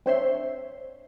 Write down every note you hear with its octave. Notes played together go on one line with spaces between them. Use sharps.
C4 D4 C5 C#5 E5 C6